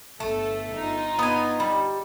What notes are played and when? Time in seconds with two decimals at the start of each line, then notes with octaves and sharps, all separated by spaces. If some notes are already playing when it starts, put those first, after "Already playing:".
0.20 G1 A3 A4
0.75 G1 D#4 F4
1.19 B3 G#5
1.60 G3